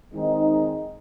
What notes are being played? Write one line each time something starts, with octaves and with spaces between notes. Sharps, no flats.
D#3 G#3 C4 D#4